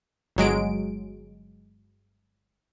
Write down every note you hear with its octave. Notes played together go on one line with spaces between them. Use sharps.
G1 F#3 G#3 D7